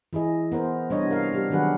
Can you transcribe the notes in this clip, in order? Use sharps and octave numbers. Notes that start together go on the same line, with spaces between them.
E3 E4 G#4 D#5
B3 A#4 C5
C3 G3 B3 D4 C#5 D#5
A#4 F5
G3 G4
D#3 F#3 D4 G#4 B4 F#5